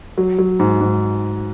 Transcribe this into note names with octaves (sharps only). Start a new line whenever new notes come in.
F#3
F#3
G#2
G#2